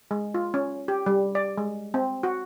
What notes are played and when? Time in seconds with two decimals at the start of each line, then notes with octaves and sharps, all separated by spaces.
0.11 G#3
0.34 F4
0.54 C#4
0.88 G4
1.06 G3
1.35 D5
1.57 G#3
1.94 C4
2.23 F#4